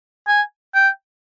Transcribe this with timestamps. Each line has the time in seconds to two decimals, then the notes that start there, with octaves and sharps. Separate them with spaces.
0.28 G#5
0.74 G5